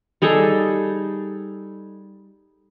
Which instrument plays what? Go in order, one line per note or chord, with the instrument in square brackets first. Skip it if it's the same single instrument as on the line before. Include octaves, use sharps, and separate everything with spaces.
[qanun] G3 D#4 G#4 A4